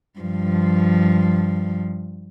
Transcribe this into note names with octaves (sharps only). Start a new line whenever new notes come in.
G2 F3